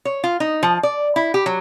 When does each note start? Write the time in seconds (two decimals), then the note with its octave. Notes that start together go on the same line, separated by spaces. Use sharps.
0.05 C#5
0.24 F4
0.40 D#4
0.63 F3
0.83 D5
1.16 E4
1.34 G4
1.46 F#3